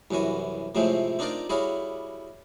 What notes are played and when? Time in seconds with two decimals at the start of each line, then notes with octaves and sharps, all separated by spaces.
0.11 C2 F#2 E3 F#4 G#5
0.75 A2 C3 F3 G#3 A3 C4
1.19 C4 D4 D#4 F4 A#4 D5
1.49 G3 E4 F#4 G#4 C#5 F5